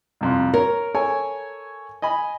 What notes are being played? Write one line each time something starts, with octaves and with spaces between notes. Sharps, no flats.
C2 F2 C6
A#4 C#5
A4 C#5 G#5
D#5 G#5 B5